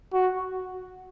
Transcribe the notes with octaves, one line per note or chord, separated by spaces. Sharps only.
F#4